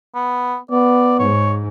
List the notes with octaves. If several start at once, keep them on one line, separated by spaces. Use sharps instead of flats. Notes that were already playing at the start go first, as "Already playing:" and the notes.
B3
B3 D5
G#2 C#5